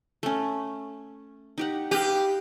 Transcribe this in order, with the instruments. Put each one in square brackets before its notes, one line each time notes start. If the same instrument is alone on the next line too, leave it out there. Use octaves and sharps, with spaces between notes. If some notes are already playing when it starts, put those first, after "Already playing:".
[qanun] A3 C#4
D#4 G4 F#5
[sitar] G4 [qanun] B4 D#5 F5